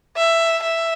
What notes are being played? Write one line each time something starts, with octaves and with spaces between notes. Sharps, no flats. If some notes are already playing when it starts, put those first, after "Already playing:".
E5
E5